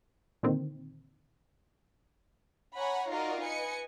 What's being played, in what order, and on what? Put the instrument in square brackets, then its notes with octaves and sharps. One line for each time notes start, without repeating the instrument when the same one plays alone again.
[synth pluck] A#2 D3 D#3 C4
[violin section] C#5 F#5 G#5 A#5 B5
D#4 F4 F#4 A#4 D5 D#5
B4 D#5 G#5 C#7